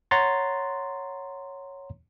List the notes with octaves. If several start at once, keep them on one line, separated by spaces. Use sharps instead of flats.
C#5 F#5 A#5 C6 A6